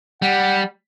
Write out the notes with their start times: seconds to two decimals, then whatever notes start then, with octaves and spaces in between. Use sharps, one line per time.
0.22 G3 F#5